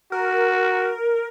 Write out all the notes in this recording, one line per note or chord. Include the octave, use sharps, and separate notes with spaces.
F#4 A#4